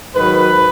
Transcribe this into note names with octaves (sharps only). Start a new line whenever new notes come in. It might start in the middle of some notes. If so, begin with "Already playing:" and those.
G#2 D#3 F#3 B4